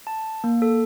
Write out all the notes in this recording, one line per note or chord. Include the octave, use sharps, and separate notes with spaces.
A5
A#3
A4